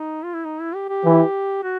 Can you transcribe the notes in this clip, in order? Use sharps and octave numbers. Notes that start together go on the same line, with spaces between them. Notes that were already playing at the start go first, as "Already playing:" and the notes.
Already playing: D#4
F4
E4
D#4
E4
G4
G4
E3
F#4